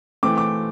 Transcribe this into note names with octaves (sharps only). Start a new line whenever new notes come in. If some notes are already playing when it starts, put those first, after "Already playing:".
E3 A3 C4 D6
D6